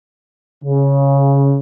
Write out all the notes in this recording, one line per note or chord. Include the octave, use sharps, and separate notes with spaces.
C#3